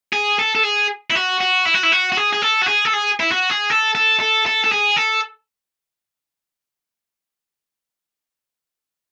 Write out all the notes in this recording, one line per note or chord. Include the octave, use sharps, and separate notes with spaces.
G#4
A4
A4
G#4
E4
F#4
F#4
E4
F#4
E4
F#4
F#4
G#4
G#4
A4
F#4
G#4
A4
G#4
E4
F#4
G#4
A4
A4
A4
A4
A4
G#4
A4